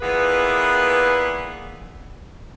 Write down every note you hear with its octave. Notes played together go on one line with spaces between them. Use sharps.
A#2 E3 A#3 B3 G#4 B4